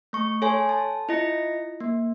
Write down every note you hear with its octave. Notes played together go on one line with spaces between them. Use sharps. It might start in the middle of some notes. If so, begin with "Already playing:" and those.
A3 C#6
A4 C#5 G#5 C6
A5
E4 F4 D#5 A#6 C#7
A#3